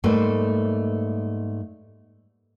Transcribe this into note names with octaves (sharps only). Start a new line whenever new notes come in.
G#2 G3 A3 A#3 B4 C5